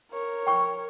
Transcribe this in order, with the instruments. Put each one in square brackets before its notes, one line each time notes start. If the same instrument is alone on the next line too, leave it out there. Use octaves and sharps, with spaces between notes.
[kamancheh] A#4 C#5
[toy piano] G5 C#6